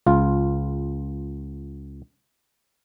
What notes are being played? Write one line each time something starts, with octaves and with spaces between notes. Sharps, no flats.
C#2 F4